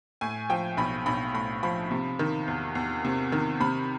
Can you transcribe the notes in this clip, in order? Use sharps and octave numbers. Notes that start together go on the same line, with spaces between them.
A2 G#5
F3 G5
B1 B5
B1 B5
A2 B5
F3 B5
C3
D#3
E2
E2
C3
D#3
C3 B5